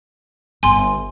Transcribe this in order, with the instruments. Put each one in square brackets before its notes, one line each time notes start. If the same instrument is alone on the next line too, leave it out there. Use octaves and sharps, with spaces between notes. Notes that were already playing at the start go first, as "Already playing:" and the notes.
[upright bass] G1 B3 [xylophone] G#5 C6